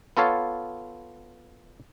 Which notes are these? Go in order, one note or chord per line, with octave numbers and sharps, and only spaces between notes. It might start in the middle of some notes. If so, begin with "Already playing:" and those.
B3 F4 A4 C#5 F5